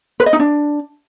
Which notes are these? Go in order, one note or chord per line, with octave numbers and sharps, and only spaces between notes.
B4
D#5
D#4
D4